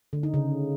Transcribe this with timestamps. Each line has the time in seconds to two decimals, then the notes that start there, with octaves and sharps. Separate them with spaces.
0.13 D3
0.23 D#4
0.34 C#3